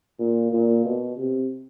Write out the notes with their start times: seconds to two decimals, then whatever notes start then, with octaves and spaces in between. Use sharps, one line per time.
0.19 A#2
0.52 A#2
0.85 B2
1.17 C3